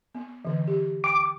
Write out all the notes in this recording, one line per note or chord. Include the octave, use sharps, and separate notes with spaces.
B3
D3 E3
G4
G5 D6